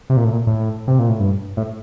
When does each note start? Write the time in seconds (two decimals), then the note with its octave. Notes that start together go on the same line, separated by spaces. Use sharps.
0.10 C3
0.17 A#2
0.25 A2
0.32 A#2
0.47 A2
0.87 C3
0.99 A#2
1.09 A2
1.20 G2
1.57 A2